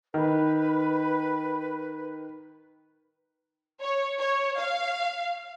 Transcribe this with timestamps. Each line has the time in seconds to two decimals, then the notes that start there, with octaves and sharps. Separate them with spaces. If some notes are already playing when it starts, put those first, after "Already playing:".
0.14 D#3 B4
3.81 C#5
4.19 C#5
4.59 F5